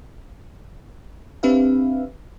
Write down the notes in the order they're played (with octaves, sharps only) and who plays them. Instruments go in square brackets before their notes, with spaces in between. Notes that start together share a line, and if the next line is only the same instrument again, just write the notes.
[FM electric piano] C4 D4 G4 B4 E5 F5